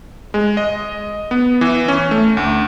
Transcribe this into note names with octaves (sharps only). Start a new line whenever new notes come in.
G#3
D#5
B3
E3
C#4
A3
D2